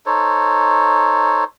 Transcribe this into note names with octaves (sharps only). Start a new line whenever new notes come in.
D#4 A4 C5 C#5